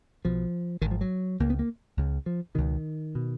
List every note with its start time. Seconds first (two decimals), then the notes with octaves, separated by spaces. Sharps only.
0.24 B1 B2 F3
0.81 G#1 D#3
0.85 G#2
0.91 F3
1.01 F#3
1.40 C#2 C#3 A#3
1.50 B3
1.59 A#3
1.97 C#2 C#3
2.26 F3
2.55 C#2 B2 D#3
3.15 B2